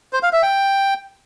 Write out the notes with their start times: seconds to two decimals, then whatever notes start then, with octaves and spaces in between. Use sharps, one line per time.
0.13 C5
0.23 F5
0.33 E5
0.43 G5